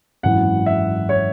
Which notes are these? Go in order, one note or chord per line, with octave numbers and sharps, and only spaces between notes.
G#1 F#2 E3 F#5
E5
C#5